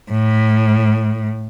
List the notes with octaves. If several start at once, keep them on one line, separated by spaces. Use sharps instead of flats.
A2